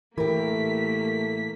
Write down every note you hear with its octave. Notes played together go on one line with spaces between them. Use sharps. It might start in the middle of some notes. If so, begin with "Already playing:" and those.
A2 E3 A3 A#3 G4 A#4 B6